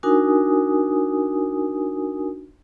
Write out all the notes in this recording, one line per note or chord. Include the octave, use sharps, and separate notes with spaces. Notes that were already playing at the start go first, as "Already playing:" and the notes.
D4 D#4 F#4 A#4 G#5 D#6